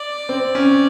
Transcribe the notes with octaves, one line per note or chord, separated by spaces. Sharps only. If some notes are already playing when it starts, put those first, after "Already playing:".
Already playing: D5
C4
C#4